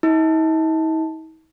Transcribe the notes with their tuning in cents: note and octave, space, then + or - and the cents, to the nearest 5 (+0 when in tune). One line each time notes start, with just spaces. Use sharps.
D#4 +45